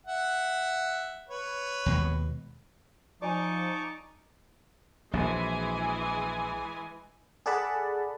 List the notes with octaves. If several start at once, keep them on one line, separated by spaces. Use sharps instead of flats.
E5 F#5
B4 C#5
D#2 B2 G#3
F3 D#4 D5 G#5 A5 C#6 D6
A#1 B2 E3 G#3 G#5
G#4 A4 D5 F#5 A5 B5